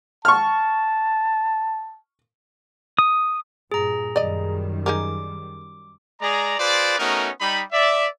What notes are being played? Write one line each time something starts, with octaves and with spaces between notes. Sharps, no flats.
A5 C#6 F6
D#6
G2 A#2 G#4 A#5
F#2 D#3 G3 D5 D#5
D#4 G#4 A#4 D6
G#3 G#4 D5 A#5
F4 G#4 B4 C5 D5
A3 B3 C#4 D#4 F#4 A#4
G3 D#4 B5
D5 E5